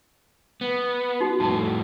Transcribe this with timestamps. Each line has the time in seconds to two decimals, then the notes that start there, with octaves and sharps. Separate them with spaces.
0.61 B3
1.20 D#4 F#4
1.40 F2 A2 A3 A5